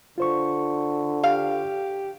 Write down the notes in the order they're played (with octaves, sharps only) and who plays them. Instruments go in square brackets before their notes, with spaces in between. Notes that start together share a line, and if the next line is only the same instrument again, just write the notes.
[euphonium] D3 [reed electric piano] F4 C5 C#6
[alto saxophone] G4 [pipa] F5